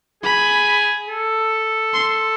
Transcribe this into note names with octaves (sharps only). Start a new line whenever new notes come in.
G#4 B5
A4
C6